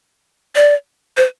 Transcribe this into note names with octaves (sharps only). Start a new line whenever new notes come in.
D5
C5